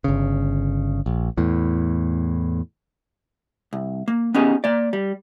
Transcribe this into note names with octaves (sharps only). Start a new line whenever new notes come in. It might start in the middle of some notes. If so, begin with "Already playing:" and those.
G1 C#3
A#1
E2 A2
C2
A#3
B3 C#4 D#4 G4 G#4
A#3 D5
G3